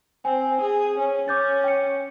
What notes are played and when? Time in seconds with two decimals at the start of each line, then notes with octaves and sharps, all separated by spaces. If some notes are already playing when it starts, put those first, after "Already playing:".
0.25 C4 G#5
0.61 G#4
0.98 C#4
1.28 C#4 D6 G6 A6
1.64 G5 C#7